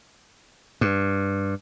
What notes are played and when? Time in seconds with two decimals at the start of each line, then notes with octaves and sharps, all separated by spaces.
0.81 G2